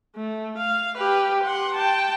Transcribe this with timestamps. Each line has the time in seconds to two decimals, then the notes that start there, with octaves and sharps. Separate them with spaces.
0.16 A3
0.58 F5
0.98 G4 B4
1.43 F#5 C6
1.75 G5 A5